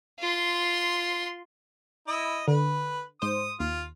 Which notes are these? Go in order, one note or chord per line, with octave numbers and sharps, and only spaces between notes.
F4 C6
E4 D#5
D3 B4
G#2 C5 D#6
D#2 F4